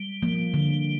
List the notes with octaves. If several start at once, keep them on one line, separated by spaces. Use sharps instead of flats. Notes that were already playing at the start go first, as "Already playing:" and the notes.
Already playing: G3
F3 A#3
D3